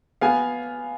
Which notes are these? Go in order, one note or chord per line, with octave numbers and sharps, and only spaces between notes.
B3 F5 G#5